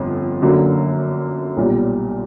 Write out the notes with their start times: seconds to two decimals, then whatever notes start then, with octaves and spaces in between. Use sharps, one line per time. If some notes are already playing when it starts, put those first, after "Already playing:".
Already playing: G1 F2
0.42 F#2 D3 F#3 A#3
1.57 B1 A#2 G3